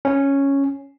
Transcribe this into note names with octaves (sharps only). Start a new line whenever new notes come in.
C#4